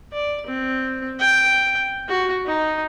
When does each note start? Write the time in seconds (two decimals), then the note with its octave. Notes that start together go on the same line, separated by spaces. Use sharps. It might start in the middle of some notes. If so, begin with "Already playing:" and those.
0.13 D5
0.47 C4
1.20 G5
2.09 F#4
2.46 D#4